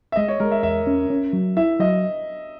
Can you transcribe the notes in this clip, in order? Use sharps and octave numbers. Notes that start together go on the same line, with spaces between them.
E5
G#3 D#5
C#5
G#3 A#4
E5
E2 E5
C#4
C#4
F#3
E4 E5
F#3 D#5